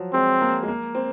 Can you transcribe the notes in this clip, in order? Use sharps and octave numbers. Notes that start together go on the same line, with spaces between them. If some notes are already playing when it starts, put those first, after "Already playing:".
Already playing: F3 F#3
G#3 C4
A#3
G#3
A#3
C4